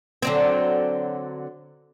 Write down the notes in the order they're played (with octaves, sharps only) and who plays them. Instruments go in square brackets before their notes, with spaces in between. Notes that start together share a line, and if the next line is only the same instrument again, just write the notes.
[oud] D3 F#3 C4